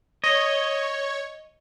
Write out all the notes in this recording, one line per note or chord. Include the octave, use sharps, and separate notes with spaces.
C#5 D#5